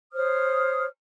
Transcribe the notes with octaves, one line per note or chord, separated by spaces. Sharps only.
C5 C#5 D#6 F6